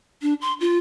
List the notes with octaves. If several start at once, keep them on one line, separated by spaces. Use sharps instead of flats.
D4
C6
F4